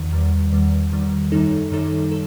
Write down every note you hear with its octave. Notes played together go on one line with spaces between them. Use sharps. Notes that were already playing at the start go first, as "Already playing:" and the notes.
Already playing: E2 D#3
E2 D#3 G3
E2 D#3 G3
E2 D#3 G3
F#2 D#3 G3 D#4 A4
F#2 D#3 G3 D#4 A4
A4